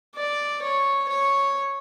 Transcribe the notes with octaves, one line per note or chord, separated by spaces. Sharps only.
D5
C#5
C#5